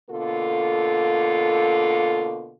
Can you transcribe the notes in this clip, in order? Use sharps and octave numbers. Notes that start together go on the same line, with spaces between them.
B2 D3 A#3 F4 A4